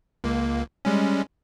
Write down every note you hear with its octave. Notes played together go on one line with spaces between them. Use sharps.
C#2 A#3
G3 G#3 C#4